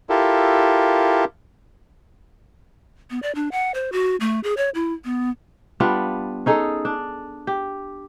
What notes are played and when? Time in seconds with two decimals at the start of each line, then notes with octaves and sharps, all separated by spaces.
0.10 E4 F4 G4 A4 A#4
3.10 B3
3.23 D5
3.35 D4
3.52 F#5
3.74 C5
3.92 F#4
4.20 A3
4.44 G#4
4.57 C#5
4.75 E4
5.05 B3
5.80 G3 B3 D4 F4
6.46 C#4 D#4 G#4 A4
6.85 D4
7.47 G4